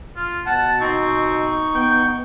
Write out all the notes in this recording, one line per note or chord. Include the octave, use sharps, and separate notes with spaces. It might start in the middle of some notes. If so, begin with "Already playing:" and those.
F4
B2 F#5 A5
C4 D#4 C#6
B3 G5